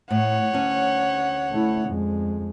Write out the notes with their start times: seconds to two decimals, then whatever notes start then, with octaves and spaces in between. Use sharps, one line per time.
0.11 A2 C#5 F#5
0.53 D2 C#4
1.51 A3 E4
1.88 F2 G#3